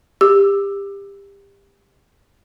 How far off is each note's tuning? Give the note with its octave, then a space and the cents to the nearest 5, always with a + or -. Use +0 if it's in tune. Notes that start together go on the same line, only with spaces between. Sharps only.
G4 +25 E6 +0